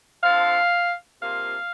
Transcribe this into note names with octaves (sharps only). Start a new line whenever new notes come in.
D3 F3 C4 F5
C3 F3 A#3 F4 F5